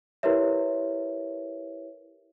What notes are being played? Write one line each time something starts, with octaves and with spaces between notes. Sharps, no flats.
E4 G4 A#4 B4 C#5 E5